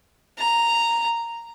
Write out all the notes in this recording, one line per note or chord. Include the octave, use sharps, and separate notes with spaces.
A#5